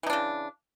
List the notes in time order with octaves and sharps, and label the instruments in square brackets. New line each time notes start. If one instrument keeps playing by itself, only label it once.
[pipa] E3
D#4
D4
C#3